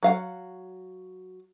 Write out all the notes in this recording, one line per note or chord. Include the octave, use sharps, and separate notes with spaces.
F#3 F5 F#5